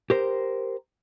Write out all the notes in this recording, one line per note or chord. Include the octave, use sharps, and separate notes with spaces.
G4 A#4 C5